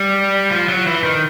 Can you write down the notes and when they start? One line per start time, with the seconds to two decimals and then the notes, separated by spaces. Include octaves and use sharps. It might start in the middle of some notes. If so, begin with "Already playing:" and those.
Already playing: G3
0.51 F3
0.69 F#3
0.87 E3
1.04 D#3